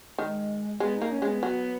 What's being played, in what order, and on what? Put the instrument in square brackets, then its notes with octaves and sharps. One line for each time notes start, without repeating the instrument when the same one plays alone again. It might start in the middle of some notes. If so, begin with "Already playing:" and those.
[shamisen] D#3 [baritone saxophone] G#3
[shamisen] G#3 [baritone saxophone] B3
[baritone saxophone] D#4
[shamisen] A#3
[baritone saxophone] C#4
[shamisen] G#3
[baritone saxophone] B3
[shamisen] F#3